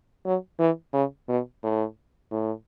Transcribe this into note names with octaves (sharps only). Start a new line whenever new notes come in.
F#3
E3
C#3
B2
A2
A2